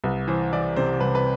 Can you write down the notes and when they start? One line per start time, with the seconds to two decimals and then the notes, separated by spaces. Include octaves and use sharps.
0.04 C2 B4
0.28 E3 C5
0.53 E3 D5
0.76 C3 C5
1.00 C2 B4
1.15 B4